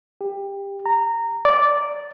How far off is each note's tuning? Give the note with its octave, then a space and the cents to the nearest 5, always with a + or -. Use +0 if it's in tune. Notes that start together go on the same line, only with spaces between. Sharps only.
G4 +20
A#5 -15
D5 -10